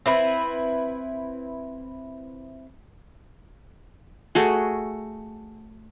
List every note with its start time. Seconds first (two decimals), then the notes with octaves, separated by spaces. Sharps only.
0.06 C4 E4 B4
4.35 A3 F#4 G#4